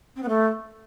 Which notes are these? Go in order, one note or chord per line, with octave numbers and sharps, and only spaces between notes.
C4
B3
A3